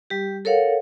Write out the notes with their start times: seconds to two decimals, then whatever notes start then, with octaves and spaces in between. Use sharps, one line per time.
0.10 G3 G4
0.45 A4 A#4 C#5 F5 F#5